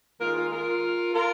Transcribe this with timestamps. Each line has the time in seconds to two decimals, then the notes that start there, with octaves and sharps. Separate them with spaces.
0.20 D#3 G#3 F4 A#4
0.35 F4 A#4
0.51 F4 A#4
1.14 F4 A#4